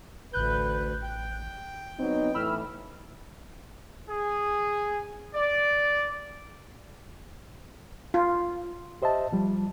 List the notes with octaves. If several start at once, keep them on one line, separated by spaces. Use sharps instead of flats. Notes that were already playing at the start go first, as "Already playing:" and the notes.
A1 D2 B4 F#6 G6
G5
F#3 B3 C4 D#4
A2 E3 B5 E6 F6
G#4
D5
F4
G4 C5 D#5 E5 A5
F3 G3